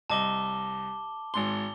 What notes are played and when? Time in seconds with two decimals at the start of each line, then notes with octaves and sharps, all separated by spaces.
0.10 C2 D#5 A5 D6 G7
1.34 G#1 G#2 C6 G7